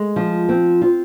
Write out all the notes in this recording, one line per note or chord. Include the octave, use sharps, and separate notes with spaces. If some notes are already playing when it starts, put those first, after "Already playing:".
Already playing: G#3
F3
C4
F4